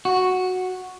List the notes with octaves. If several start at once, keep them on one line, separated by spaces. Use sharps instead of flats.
F#4